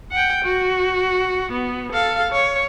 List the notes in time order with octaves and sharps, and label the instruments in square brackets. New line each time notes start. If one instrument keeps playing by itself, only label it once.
[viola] F#5 G5
F#4
B3
A4 F5
C#5